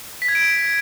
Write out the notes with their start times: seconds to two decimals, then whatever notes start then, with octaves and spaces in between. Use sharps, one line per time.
0.22 B6
0.28 G#6
0.35 D7